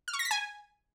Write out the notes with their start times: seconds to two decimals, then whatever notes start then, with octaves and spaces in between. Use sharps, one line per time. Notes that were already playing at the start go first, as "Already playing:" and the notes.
0.08 F6
0.13 C#6
0.19 A#6
0.25 B6
0.31 G#5